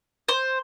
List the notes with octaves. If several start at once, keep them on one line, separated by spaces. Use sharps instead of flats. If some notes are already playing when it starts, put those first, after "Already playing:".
C5